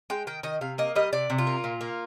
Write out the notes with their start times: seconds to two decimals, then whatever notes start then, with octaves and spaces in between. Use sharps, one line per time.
0.10 G#3 G5
0.27 D#3 G5
0.43 D#3 D#5
0.61 C3 F5
0.78 A#3 D#5
0.96 G3 D#5
1.13 C3 D5
1.30 C3
1.38 F4
1.47 A#3
1.64 A#2
1.81 A#3